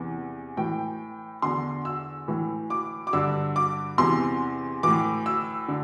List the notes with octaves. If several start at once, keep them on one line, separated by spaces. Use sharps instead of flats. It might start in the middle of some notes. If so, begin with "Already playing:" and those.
Already playing: E2 C3 E3
A2 E3 G5
E2 D3 C6
E6
A2 E3
D6
D6
G2 D3 E6
D6
E2 C3 E3 C6
A2 E3 D6
E6
D3